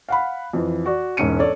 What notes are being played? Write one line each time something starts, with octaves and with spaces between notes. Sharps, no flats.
F5 F#5 B5
F2 E3
F#4 D5
E1 G#2 C#4 C#7 D#7
D4 A4 C#5 D5